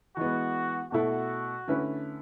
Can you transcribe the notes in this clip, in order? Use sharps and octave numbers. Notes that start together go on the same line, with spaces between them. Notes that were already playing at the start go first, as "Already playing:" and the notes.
E3 G#3 B3 F#4
B2 A3 E4 F#4 A4
D3 A3 C#4 E4 B4